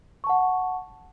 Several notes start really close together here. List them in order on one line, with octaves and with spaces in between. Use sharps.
C#6 A5 F#5